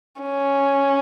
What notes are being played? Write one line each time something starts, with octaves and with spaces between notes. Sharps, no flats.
C#4